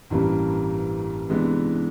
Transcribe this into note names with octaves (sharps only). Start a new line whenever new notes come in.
A1 G2 E3 G3 A#3
C3 E3 G#3 B3 D4